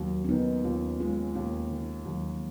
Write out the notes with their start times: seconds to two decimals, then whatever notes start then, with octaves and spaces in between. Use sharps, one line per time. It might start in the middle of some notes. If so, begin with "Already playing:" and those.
Already playing: D#2 F#3 A#3
0.24 C#4
0.29 D#3 B3 D#4
0.65 D#2 C#4 F4
1.00 G#3 C#4 F4
1.35 D#2 A#3 C#4
1.71 D#3
2.06 D#2 F#3
2.22 F#3
2.31 F3